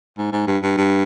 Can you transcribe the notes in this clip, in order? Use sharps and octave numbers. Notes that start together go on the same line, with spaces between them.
G#2
G#2
G2
G2
G2